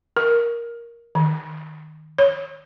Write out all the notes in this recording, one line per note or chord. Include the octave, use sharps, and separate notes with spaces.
A#4
D#3
C#5